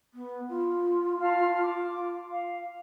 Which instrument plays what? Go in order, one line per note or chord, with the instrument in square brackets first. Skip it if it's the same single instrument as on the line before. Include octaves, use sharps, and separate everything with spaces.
[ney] B3
F4
[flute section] F5 A5 F6
D6
F5